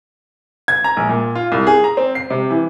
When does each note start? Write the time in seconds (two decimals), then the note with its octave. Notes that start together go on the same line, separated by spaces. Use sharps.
0.68 G#6
0.84 A#5
0.97 A#1
1.09 A#2
1.35 F4
1.52 C2
1.67 G#4
1.84 A#5
1.97 C4
2.15 C7
2.30 C3
2.50 E3